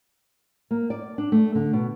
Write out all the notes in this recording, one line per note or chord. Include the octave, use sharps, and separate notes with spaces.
A#3
D5
D4
A3
D3
B2